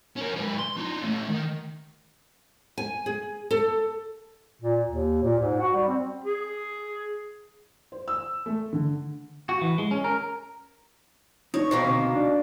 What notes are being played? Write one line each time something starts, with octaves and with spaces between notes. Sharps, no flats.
C#4 A#4
G#2 B4
C6
D4 D#4
A3 C#4
D#3
G#5
G#4
A4
A#2
D#2
A#2
G#2
F#4
G3
C4
G#4
C5
E6
A3
D3
F#4
E3
G#3
C#4
A#4
D#4 C#5
B2 D#3 A#3 C5
D2 C3
D4